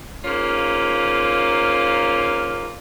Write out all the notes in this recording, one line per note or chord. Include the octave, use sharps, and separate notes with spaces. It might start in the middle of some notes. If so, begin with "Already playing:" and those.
G#2 A#3 C#4 F4